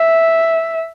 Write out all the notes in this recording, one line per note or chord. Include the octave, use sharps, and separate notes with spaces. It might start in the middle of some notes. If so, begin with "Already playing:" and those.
Already playing: E5